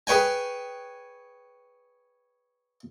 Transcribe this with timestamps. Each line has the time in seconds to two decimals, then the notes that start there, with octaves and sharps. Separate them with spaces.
0.07 G#4 B4 C#5 G5 G#5